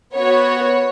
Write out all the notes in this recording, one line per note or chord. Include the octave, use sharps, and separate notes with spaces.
B3 F#4 C#5